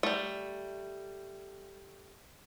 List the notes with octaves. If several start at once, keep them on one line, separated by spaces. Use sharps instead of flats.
G3 A3